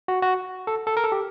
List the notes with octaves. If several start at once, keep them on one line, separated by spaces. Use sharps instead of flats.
F#4
F#4
A4
A4
A#4
A4
G4